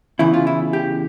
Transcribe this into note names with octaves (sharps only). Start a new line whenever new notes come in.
E2 C#3 E3 E4
F4
E4
G4